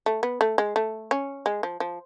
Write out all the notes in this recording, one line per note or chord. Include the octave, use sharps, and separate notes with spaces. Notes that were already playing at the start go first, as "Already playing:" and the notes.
A3
B3
A3
G#3
A3
C#4
G#3
F3
F3